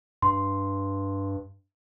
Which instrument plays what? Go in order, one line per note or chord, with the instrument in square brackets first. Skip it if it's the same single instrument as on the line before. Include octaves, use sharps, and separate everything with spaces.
[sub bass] G2 [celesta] C6